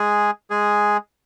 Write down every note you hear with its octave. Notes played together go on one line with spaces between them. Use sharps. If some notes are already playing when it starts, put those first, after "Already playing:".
Already playing: G#3 G#4
G#3 G#4